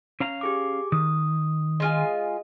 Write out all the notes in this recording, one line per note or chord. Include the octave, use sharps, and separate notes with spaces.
C#4 F5 A#5
G4 G#4 D6
D#3 D#6
G#3 F4 D#5 G#5